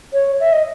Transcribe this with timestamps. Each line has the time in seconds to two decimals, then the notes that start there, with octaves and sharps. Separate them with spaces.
0.13 C#5
0.40 E5
0.52 D#5